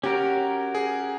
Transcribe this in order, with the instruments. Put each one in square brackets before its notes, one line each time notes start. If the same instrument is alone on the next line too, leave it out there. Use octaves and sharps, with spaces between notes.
[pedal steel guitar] C#4 F#4 A#4 [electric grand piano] G4
[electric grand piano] G#4